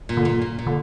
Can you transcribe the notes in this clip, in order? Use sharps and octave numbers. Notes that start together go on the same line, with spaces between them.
A#2
D3
A#2
A#2
A#2
D3